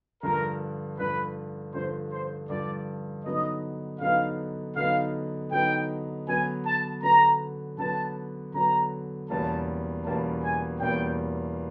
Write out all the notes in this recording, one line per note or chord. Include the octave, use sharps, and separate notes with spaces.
G2 D3 F3 A#4
G2 D3 F3 B4
G2 D3 F3 C5
C5
G2 D3 F3 D5
D3 F#3 B3 D#4 D#5
D3 F#3 B3 D#4 F5
D3 F#3 B3 D#4 F5
D3 F#3 B3 D#4 G5
D3 F#3 B3 G#5
A5
D3 F#3 B3 A#5
D3 F#3 B3 A5
D3 F#3 B3 A#5
E2 B2 G3 A#3 C#4 A5
E2 B2 G3 A#3 C#4 A5
G#5
E2 B2 G3 A#3 C#4 G5